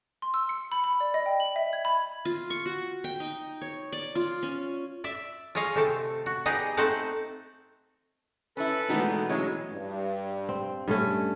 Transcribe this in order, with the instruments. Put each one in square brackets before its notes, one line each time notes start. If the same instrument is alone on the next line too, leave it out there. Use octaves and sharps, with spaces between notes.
[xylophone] C6
E6
C#7
B5
B5
D5
D#5
G5
F#7
E5
G#6
B5
[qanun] F4
C#6
F#4
G5
D#4
C#5
D5
F4
C#4
[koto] D5 E5
F4 G#4 C#5 D#5 F5
C3 A3 C4 A4
F#4
B3 D#4 G4 G#4 D5 D#5
A3 C4 D#4 C5 F#5 A5
[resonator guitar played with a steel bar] C#4 E4 [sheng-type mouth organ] A4 B4
[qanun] B2 E3 [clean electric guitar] D#3 G#3 A3 [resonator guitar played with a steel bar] B3 D4 D#4
[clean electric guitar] A2 E3 C#4 [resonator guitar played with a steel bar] F#3 G#3 [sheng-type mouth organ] C#5
[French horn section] G2
[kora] C4
G2 A3 C#4